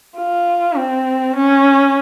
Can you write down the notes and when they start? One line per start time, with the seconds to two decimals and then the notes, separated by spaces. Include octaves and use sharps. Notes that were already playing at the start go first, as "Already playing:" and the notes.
0.18 F4
0.76 C4
1.35 C#4